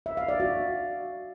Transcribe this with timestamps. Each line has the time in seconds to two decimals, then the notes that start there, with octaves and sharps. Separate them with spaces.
0.06 E5
0.17 F5
0.28 D5
0.40 F#4